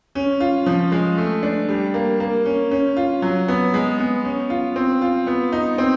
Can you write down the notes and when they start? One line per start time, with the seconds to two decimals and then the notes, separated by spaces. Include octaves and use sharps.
0.15 C#4
0.40 F4
0.66 F3
0.92 G#3
1.18 A3
1.43 D4
1.69 G3
1.94 A#3
2.20 A#3
2.45 C#4
2.71 C#4
2.97 F4
3.22 F#3
3.48 B3
3.74 G#3
3.99 B3
4.25 C#4
4.50 F4
4.76 C4
5.02 F4
5.27 B3
5.52 D#4
5.78 C4